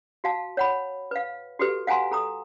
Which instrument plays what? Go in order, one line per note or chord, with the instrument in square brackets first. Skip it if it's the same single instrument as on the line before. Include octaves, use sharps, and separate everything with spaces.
[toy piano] F#4 F5 A5
C#5 F#5 B5
B4 F5
F#4 G4 A4 B4
F5 F#5 G#5 A#5 C6
A4 A#5 D#6